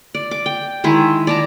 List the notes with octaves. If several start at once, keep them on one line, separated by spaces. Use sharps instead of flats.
D5
D6
G5
D#3 G#3 E4
D5 A5 A#5